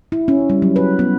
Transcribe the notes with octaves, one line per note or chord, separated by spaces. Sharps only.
E4
C#4
G3
F#3
B4
B3